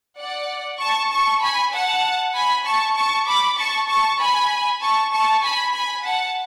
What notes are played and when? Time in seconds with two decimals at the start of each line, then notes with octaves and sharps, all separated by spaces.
0.18 D5 F#5
0.80 A5 C#6
1.12 A5 C#6
1.42 G#5 B5
1.73 F#5 A5
2.35 G#5 B5
2.65 A5 C#6
2.96 A5 C#6
3.27 B5 D6
3.58 A5 C#6
3.89 A5 C#6
4.20 G#5 B5
4.81 A5 C#6
5.12 A5 C#6
5.43 G#5 B5
5.74 G#5 B5
6.04 F#5 A5